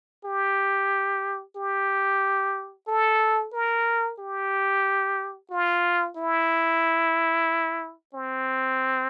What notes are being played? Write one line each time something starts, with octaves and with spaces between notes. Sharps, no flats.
G4
G4
A4
A#4
G4
F4
E4
C4